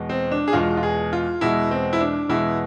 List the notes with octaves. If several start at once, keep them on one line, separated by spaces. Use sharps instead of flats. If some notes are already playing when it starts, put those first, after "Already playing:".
Already playing: E2 B2 G#3
C4
D4
G#4
E2 B2 G#3 F4
F4
G#4
F4
E2 B2 G#3 E4
C4
E4
D4
E2 B2 G#3 E4